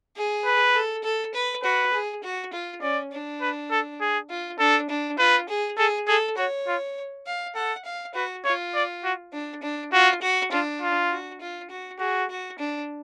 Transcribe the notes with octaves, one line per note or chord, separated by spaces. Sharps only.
G#4
B4
A4
A4
B4
F#4 B4
G#4
F#4
F4
C#4 D5
D4
B4
A4
G#4
F4
D4 A4
D4
F4 B4
G#4
G#4 A4
G#4 A4
F#4 C#5
F4
F5
A4 F#5
F5
F#4 B4
F4 C#5
D5
F#4
D4
D4
F4 F#4
F#4
D4 F4
F4
F#4
F4
F#4
F#4 G#4
F#4
D4